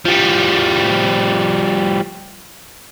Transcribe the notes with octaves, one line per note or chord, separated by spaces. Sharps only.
F3 G3